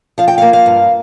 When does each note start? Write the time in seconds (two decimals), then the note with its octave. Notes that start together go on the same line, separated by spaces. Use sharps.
0.18 F3 F5
0.28 G5
0.38 A#3 F5
0.53 F5
0.66 G2